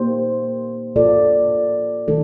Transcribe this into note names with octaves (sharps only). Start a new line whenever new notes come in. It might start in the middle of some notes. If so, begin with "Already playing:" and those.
Already playing: A#3 D#4 G4 C5
A#3 F4 A4 D5
D#3 A3 D#4 A4